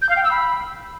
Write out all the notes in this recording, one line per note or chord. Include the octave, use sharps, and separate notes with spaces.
G6
F5
G5
E6
B5